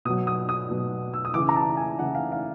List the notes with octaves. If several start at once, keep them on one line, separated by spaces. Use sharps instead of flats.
B2 F#3 D#6
D#6
D#6
B2 F#3
E6
D#6
C#3 E3 D6
A#5
A5
G#5
C#3 E3 F#5
F5
F5